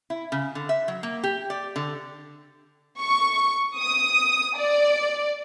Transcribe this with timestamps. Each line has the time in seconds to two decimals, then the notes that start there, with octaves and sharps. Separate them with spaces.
0.10 E4
0.32 C#3
0.55 D3
0.69 E5
0.88 F#3
1.03 A#3
1.24 G4
1.50 D5
1.76 D3
3.00 C#6
3.78 D#6
4.57 D5